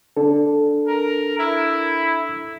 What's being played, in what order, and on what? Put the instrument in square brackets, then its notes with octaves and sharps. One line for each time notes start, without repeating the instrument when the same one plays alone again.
[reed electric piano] D4 A4
[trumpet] A#4
E4